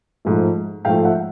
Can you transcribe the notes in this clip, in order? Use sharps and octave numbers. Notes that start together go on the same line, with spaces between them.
G#2 F3 A3
G#2 F3 A3 F5 G5
E5 F#5